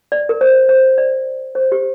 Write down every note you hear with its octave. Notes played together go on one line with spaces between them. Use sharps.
D5
A#4
C5
C5
D5
C5
G4